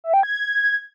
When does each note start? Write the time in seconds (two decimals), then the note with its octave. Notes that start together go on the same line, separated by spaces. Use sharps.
0.04 E5
0.14 G5
0.23 G#6